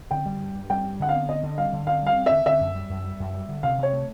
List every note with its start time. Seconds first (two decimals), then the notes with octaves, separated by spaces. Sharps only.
0.11 D3 G5
0.26 G3
0.40 G2
0.55 G2
0.70 G3 G5
0.84 G2
1.00 D3 F#5
1.09 B3 F5
1.29 D3 D#5
1.43 D3
1.58 G3 F5
1.73 D3
1.87 D3 F5
2.02 G3 F5
2.17 C4
2.26 E5
2.31 D3
2.46 D3 E5
2.60 F#2
2.75 G3
2.90 F#2
3.05 G3
3.20 F#2
3.34 G3
3.49 D3
3.63 C3 F5
3.78 C3 C#5
3.93 A3